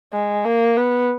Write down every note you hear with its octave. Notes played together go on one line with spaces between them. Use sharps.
G#3
A#3
B3